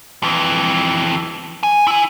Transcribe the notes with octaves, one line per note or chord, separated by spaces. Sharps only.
F2 E3
G#5
E4 G#5